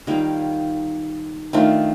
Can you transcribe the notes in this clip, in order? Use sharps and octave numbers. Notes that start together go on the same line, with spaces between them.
D#3 G3 A#3 F4
D#3 A3 D4 F4